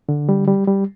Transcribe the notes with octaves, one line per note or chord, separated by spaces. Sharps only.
D3
G3
G3
G3